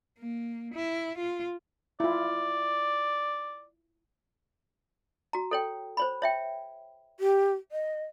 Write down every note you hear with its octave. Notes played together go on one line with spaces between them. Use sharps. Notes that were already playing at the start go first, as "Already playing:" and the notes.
A#3
E4
F4
E4 F4 D5
F#4 A#5
A4 C#5 G5
C5 C#5 B5
C#5 E5 G5
G4
D#5